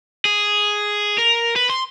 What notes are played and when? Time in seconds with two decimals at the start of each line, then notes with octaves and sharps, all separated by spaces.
0.25 G#4
1.18 A#4
1.56 B4
1.70 C6